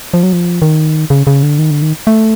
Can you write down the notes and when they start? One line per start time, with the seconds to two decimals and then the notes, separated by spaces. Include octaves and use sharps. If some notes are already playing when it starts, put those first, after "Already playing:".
0.14 F3
0.23 F#3
0.33 F3
0.62 D#3
1.10 C#3
1.27 C#3
1.43 D3
1.59 D#3
1.71 D3
1.82 D#3
2.07 A3